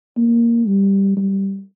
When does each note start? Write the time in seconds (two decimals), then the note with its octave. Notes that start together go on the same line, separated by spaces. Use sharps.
0.17 A#3
0.67 G3
1.17 G3